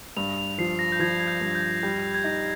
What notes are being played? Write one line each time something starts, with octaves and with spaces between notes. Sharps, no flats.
G2 F7
F7
F3 C7
A#6
G6
F3 G#6
G#6
G6
G2
G6
G3 G6
G#6
D#4 A#6